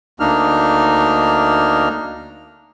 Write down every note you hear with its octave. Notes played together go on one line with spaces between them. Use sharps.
D2 A#3 D4 D#4 F6